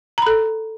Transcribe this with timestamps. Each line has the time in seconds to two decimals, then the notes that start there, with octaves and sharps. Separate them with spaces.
0.18 A#5
0.22 B5
0.26 A4